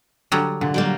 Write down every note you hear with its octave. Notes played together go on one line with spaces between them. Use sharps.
D3 F#3 G3
A#2 D3
F#3 G3 A#3